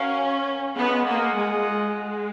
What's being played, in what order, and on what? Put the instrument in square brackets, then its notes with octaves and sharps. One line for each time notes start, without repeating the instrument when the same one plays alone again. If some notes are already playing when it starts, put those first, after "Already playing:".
Already playing: [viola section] C#4 [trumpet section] F#4 A#4 F5
[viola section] B3 [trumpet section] F4 G#4 D#5 F#5
[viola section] A#3
G#3
G#3